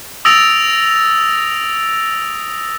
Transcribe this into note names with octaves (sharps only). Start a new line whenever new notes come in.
D#6 E6 A6 A#6 D7 F7